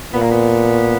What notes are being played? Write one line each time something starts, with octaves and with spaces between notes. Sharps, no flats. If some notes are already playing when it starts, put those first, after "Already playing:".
A#2 B3
A#3
B3